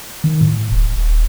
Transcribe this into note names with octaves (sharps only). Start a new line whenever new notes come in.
D#3
A2
D#1
D#1